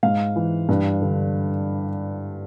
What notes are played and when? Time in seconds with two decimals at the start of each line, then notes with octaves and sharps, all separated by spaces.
0.03 G#2 F5
0.36 E3
0.69 G2
1.02 D3